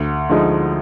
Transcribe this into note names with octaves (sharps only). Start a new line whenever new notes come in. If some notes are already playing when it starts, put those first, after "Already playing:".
Already playing: D2
D3 F3 G#3 D#4